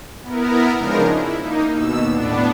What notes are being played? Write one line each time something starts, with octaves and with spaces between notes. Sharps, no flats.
B3 E4 A#4
C#3 F3 G#3 D4 D#4 A#4
E4
A#3 D#4
D#2 B2 E6
A2 B3 D4